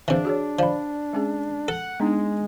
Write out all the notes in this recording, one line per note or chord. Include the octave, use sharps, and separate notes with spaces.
C3 E3 D4 G#4 F5
F#4 G#4 C#5
F3 D5 B5
G#3 C#4 G#4
A4 F#5
G#3 B3 D4 D#4